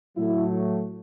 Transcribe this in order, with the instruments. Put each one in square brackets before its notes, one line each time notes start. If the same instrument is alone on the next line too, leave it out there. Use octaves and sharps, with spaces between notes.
[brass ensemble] A2 F#3 A3 E4